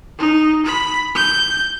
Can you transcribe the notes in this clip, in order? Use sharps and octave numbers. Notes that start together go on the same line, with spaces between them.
D#4
B5
G6